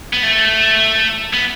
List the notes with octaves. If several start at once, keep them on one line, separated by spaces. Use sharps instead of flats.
B3
A3
B3